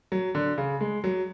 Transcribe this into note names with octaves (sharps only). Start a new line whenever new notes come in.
F#3
D3
C#3
G#3
F#3